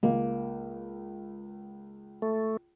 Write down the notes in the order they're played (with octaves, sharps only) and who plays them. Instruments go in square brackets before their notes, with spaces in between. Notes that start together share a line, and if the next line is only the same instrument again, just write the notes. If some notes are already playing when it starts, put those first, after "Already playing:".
[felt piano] C#2 [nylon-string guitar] A#3
[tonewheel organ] A3